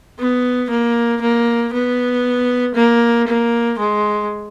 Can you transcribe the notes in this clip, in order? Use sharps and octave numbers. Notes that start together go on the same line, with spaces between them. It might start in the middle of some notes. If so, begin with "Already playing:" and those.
B3
A#3
A#3
B3
A#3
A#3
G#3